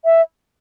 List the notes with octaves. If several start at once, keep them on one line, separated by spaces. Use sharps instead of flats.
E5